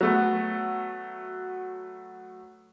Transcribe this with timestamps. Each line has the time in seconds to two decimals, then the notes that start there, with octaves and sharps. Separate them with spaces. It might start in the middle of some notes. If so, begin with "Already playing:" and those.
0.01 F#3 A3 B3